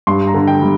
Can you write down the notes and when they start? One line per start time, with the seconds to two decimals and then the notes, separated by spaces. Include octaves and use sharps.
0.07 G2 C6
0.27 A#5
0.34 D3
0.48 G5
0.62 G3